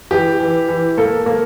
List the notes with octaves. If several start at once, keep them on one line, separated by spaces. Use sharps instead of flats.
E3 G4
E3
E3
A#3 A4
A#3